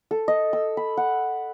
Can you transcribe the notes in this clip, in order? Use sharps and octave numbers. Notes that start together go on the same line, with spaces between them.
A4
D#5
E6
B5
F#5